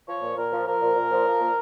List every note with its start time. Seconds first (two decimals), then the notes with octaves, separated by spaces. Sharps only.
0.07 F3 C#5
0.22 A#2
0.36 A#2 A#4
0.51 F3
0.66 F3 A#4
0.82 A#2
0.96 A#2
1.11 F3
1.27 F3
1.41 A#2